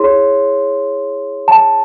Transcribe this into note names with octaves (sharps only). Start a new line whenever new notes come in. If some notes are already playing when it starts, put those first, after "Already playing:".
Already playing: E4 G#4 C#5 C6
A5